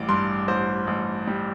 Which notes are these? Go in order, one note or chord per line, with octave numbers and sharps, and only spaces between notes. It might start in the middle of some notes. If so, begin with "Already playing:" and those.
Already playing: A1 G3 D6
G2 C6
A1 C5
A1
G3